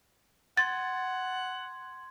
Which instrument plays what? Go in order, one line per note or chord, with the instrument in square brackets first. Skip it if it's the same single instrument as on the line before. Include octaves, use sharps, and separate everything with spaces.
[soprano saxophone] F#5 [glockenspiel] C6 G#6 [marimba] A6